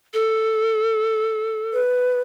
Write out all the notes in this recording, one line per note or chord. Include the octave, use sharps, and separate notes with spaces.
A4
B4